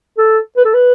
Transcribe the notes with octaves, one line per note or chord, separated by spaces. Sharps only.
A4
B4
A4
B4